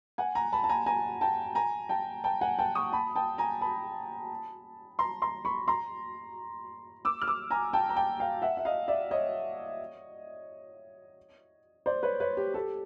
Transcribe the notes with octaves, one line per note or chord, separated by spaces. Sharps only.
F#5 G#5
G#5 A#5
A5 B5
A5
G#5 A#5
G#5 A#5
G5 A5
G#5 A#5
G5 A5
G5 A5
F#5 G#5
G5 A5
C#6 D#6
A5 B5
G5 A5
G#5 A#5
A5 B5
A#5 C6
A#5 C6
B5 C#6
A#5 C6
D6 E6
F6
D6 E6
G#5 A#5
G5 A5
A#5
G5 A5
F5 G5
E5 F#5
E5
D#5 F5
D5 E5
C#5 D#5
C5 D5
B4 C#5
B4 C#5
G4
G4 A4